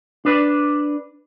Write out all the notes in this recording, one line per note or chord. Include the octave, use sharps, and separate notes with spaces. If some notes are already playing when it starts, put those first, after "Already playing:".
D4 B4 D5